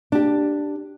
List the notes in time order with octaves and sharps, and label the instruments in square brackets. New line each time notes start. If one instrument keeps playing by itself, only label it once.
[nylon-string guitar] D4 G4